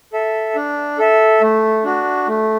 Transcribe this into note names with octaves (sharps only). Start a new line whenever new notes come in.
A4 E5
D4
A4 E5
A3
D4 F#4
A3